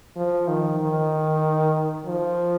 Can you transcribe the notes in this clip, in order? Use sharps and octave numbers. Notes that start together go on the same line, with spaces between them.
F3
D#3
D#3
F3